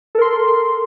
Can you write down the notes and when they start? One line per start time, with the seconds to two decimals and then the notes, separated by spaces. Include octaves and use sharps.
0.15 A4
0.18 A#4
0.22 C6